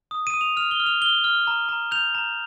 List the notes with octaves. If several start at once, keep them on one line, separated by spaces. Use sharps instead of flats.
D#6
D#7
D#6
F7
F6 F7
G7
F6
F7
F6 G7
F6
A#5
A#5
G6 F7
A#5